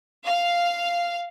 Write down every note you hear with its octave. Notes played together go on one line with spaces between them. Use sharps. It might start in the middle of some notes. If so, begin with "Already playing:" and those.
F5